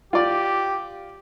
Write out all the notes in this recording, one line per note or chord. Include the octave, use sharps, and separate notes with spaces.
F4 G4 D5